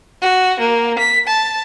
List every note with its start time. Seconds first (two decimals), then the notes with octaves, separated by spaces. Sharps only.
0.22 F#4
0.59 A#3
0.98 B6
1.27 A5